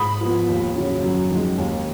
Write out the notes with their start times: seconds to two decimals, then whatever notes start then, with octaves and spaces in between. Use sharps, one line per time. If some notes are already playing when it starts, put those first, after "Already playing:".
Already playing: G#2 B5 D#6
0.21 F3 B3
0.48 D#2
0.76 C#3 F#3 C#4
1.03 F#2
1.31 D#3 G#3
1.58 D#2